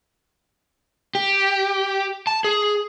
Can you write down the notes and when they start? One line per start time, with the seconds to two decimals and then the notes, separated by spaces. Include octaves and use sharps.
1.15 G4
2.27 A5
2.44 G#4